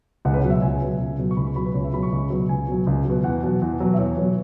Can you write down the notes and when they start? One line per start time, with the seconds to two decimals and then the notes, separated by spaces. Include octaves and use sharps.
0.25 C#2 F#5
0.34 B4
0.37 C#5
0.44 B2 F#3
0.50 E5
0.62 C#2 G#5
0.81 B2 F#3
1.00 C#2
1.18 B2 F#3
1.31 C#6
1.37 C#2 B5
1.47 C#6
1.56 B2 F#3 B5
1.66 B4
1.74 C#2 C#5
1.84 E5
1.93 B2 F#3 B5
2.03 C#6
2.12 C#2
2.30 B2 F#3
2.49 C#2 G#5
2.68 B2 F#3
2.87 C#2
3.05 B2 F#3
3.24 E2 F#5
3.43 B2 F#3
3.62 E2
3.80 B2 F#3
3.94 E5
3.98 E2 C#5
4.17 B2 F#3